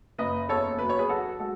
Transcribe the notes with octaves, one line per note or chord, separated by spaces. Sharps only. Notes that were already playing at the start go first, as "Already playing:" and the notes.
F#1 B4 D#5
E2 A4 C#5
F#3 B4
C#5
G#4 B4
F#3 F#4 A4
G#3 F#4 A4